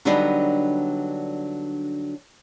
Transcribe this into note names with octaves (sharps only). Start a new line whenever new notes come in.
D3 F#3 G3 B3 D4 D#4